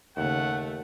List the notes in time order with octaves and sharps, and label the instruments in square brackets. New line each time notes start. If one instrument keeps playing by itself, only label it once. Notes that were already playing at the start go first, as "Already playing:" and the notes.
[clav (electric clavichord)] D#2 [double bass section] C#3 [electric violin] A3 [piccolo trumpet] F#5